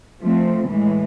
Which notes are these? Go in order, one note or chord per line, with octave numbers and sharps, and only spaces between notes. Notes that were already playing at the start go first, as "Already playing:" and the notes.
F3 A3 C4
A2 E3 G#3